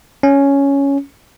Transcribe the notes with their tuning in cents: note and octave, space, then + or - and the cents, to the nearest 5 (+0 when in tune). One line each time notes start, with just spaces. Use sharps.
C#4 +5